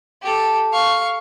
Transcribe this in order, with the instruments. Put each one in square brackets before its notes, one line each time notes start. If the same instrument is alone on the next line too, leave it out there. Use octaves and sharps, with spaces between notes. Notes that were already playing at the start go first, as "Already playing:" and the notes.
[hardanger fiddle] G4 A4
F5 C#6